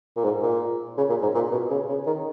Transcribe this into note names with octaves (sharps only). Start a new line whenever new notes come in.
A#2
G#2
A#2
C#3
A#2
G#2
A#2
B2
C#3
C#3
D#3